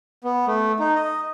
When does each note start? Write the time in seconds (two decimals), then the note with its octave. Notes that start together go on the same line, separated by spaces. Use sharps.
0.24 B3
0.47 A3
0.79 D#4
0.95 D#5